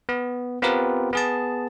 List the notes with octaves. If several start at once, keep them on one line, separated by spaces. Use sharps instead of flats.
B3
B3 C4 F4 G4 A#4 B4
B3 G#4 A5